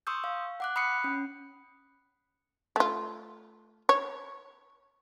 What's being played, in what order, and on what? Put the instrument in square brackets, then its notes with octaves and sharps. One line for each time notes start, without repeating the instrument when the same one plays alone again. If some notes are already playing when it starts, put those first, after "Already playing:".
[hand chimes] C6 C#6 D#6 E6 G6
F5
F#5 D6 F#6
B5 D#6 F#6 C7 C#7
C#4
[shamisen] A3 F4
C#5